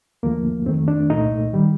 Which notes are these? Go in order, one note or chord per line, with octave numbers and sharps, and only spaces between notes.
D#2 D3 F3 A3 A#3
F2 D#3 A3 C4
D4
C2 A#2 A3 D#4
D#3 G3